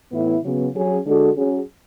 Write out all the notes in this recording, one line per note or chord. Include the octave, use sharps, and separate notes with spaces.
A2 E3 B3 E4
C#3 F#3 B3
F#3 C#4 G#4
D3 G#3 D4 F#4 A4
F#3 C#4 G#4